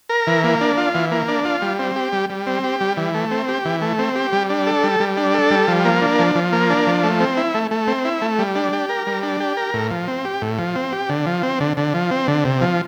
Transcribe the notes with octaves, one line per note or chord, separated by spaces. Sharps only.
A#4
E3
A#3
D4
F4
E3
A#3
D4
F4
G3
C4
G4
G3
G3
C4
G4
G3
E3
A3
C4
G4
E3
A3
C4
G4
G3
D4
A4
G3
G3
D4
A4
G3
F3
A#3
D4
F3
F3
A#3
D4
F3
A3
C4
E4
A3
A3
C4
E4
A3
G3
D4
G4
A#4
G3
D4
G4
A#4
A2
F3
C4
G4
A2
F3
C4
G4
D3
F3
C4
D3
D3
F3
C4
D3
C3
F3